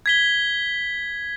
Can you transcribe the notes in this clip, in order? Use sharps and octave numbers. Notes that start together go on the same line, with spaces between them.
G#6 B6 G7